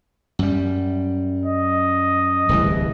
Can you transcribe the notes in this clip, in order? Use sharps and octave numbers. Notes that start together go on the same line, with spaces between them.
F#2 G3
D#5
D1 C2 E3